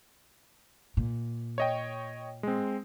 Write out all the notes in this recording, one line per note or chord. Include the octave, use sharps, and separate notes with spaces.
A#2
C#5 D#5 G5
G#3 C4